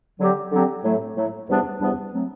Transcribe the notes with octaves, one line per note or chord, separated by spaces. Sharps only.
D3 F#3 C4 G4
D3 F#3 C4 G4
A2 F#3 A3
A2 F#3 A3
E2 C3 G3 B3 D4
E2 C3 G3 B3 D4
F#3 A3 C4